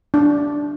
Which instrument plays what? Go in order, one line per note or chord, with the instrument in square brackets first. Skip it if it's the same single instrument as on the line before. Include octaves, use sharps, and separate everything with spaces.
[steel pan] D4